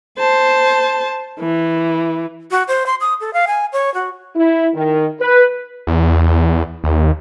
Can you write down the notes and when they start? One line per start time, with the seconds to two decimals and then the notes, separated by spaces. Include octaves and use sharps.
0.18 C5 A5
1.40 E3
2.51 F#4
2.68 C5
2.86 C6
3.01 D#6
3.21 A4
3.33 F5
3.47 G#5
3.73 C#5
3.94 F#4
4.36 E4
4.74 D#3
5.20 B4
5.87 E2
6.84 D#2